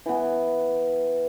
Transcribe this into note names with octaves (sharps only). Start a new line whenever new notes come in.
E3 B3